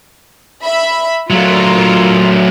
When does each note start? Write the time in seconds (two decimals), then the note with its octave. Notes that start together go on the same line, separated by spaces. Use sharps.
0.63 E5 B5
1.30 F#3 A3 F4 A#4